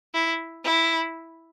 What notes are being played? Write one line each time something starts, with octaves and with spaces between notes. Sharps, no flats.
E4
E4